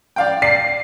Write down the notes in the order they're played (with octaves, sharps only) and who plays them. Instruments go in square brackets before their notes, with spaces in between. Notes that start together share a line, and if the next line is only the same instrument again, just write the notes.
[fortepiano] D5 F5 G5
[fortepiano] D5 [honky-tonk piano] C7